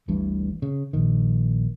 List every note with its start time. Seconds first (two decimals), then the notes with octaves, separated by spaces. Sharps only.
0.08 G1 D2 G2 E3
0.62 C#3
0.93 A#1 D#3